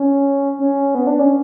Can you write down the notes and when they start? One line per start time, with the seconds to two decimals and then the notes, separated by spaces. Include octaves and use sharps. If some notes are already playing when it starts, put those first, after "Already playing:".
Already playing: C#4
0.59 C#4
0.95 B3
1.07 D4
1.19 C#4